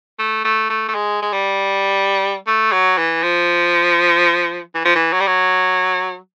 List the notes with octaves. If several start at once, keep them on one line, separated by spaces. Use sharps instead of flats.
A3
A3
A3
A3
G#3
G#3
G3
A3
F#3
E3
F3
E3
F3
E3
F#3
G3
F#3